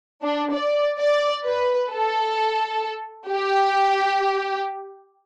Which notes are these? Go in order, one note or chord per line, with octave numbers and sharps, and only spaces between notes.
D4
D5
D5
B4
A4
G4